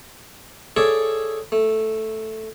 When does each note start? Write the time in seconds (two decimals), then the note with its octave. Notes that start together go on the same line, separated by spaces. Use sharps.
0.77 G#4 A4 C#5 D5 E5
1.52 A3